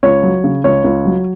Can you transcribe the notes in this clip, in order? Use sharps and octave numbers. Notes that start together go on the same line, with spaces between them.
C#2 C#5
F#3
C#3
C#2 C#5
C#2
F#3